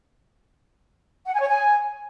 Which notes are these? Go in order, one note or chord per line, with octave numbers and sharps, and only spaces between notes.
F#5
G#5
C#5
G#5